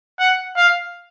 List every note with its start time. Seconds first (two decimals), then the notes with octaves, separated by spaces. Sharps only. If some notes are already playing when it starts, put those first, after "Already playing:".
0.19 F#5
0.57 F5